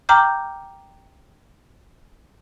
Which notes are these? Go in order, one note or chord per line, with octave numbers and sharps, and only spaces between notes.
G5 A#5 D6 F6 G6